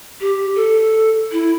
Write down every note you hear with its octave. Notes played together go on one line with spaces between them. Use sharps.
G4
A4
E4